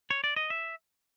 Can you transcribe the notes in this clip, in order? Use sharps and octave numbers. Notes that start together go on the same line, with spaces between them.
C#5
D5
D#5
E5